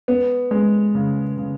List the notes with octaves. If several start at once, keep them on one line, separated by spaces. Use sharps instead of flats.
B3
G#3
C#3
C#3